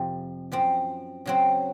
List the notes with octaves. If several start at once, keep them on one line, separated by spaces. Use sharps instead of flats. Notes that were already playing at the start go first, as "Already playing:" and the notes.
Already playing: F2 C3 F3
F#2 F3 C4
C#3 F#3 C4